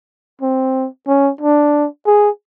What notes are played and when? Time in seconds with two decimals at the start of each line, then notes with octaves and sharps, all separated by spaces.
0.41 C4
1.08 C#4
1.41 D4
2.06 G#4